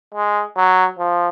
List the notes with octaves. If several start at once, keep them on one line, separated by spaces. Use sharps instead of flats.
G#3
F#3
F3